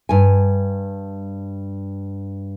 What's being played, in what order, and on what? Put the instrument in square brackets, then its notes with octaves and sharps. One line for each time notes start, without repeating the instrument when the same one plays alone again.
[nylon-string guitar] G2 G#5